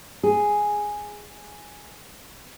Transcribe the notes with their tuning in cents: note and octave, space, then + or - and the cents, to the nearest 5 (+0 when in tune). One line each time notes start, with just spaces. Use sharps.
G#4 +0